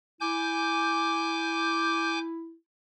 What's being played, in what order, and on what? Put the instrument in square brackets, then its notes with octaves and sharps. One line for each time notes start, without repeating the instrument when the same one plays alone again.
[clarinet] E4 [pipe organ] G#5 D6 G6